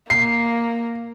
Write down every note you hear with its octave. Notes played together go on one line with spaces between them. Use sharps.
A#3 C7